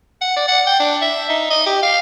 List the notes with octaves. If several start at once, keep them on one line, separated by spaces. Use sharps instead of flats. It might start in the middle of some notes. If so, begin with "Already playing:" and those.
F#5
D5
F#5
G5
D4
E5
D#4
D#5
G4
F5